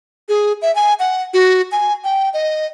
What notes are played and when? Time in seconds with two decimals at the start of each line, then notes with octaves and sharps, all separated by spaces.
0.29 G#4
0.62 E5
0.75 G#5
0.99 F#5
1.34 F#4
1.72 G#5
2.04 G5
2.34 D#5